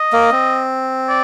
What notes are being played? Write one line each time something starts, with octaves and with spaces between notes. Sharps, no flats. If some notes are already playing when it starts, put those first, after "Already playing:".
Already playing: D#5
A#3
C4
D5